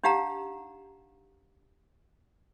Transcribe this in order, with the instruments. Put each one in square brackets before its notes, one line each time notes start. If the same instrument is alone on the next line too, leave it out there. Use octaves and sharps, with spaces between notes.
[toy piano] D4 D#4 G4 F5 F#5 A#5